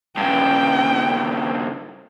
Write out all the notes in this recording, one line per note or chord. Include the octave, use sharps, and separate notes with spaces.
G2 C#3 G5